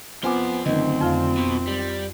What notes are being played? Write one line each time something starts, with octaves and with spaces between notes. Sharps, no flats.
F2 B3 C4 F4 C5 G#5 D6
F#1 D2 D#3 C4 D#5
F2 F4 F5
B2
G3